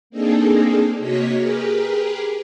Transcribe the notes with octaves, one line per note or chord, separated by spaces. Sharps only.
A#3 C4 D4 D#4 G#4 A4
C3 A#3 F#4 C#5 D#5 B6
G4 G#4 A#4 B4